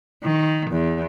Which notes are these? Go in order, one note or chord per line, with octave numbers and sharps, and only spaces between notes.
D#3
E2